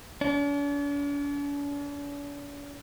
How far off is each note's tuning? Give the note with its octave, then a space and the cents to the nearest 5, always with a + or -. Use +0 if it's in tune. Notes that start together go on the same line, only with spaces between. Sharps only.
D4 -45